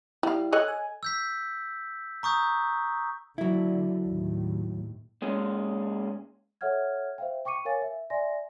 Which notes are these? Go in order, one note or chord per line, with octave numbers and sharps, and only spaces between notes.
G3 E4 F5
A4 C#5 D#5 F#6
G#5
E6 G6 B6
A#5 C#6 D#6 G6
D3 F#3 E4
D#2 A2
A#2 G#3 C#4
A4 C#5 E5 F#5 F6 G#6
C5 E5 F5 G5
G5 C#6 D6 C#7 D#7
A#4 C#5 F5 G#5 A6
E5
D5 E5 G#5 C6 A#6